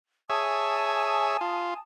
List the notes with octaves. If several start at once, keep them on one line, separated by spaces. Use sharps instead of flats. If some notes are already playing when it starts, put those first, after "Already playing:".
G#4 C#5 E5 G#5 A5 D#6
F4